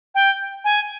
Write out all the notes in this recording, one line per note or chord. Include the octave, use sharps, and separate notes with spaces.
G5
G#5